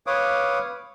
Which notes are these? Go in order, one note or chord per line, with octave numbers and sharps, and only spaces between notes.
B4 C#5 F5 D6 D#6